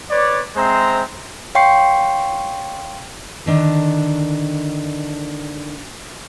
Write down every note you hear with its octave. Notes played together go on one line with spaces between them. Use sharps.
B4 C#5 D5
G#3 C4 C5 E5 A#5
C#5 F5 G5 C6 C#6 C7
D3 D#3 D4